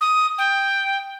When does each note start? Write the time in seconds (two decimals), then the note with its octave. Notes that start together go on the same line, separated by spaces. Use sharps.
0.01 D#6
0.38 G5